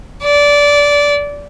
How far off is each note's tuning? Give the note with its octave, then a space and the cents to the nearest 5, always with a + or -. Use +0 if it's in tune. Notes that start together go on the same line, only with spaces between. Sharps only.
D5 -20